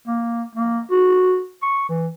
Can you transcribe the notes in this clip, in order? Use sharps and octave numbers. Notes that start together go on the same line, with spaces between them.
A#3
A#3
F#4
C#6
E3